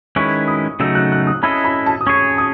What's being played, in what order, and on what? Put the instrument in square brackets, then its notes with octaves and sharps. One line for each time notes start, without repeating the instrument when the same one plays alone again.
[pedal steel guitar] D#3 G#3 C#4 E4 B4 [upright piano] C#6
[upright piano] D#6
[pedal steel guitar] C#3 F#3 A3 D#4 [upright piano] E6
[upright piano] F#6
F#6
D#6
[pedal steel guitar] C#4 E4 A4 D#5 [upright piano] B5
[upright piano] B5
A5
D#6
[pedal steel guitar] C#4 G#4 C#5 [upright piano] C#6
[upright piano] D#6